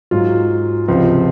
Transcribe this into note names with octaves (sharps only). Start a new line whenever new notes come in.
G#2 F#3 F4
C#2 C3 F3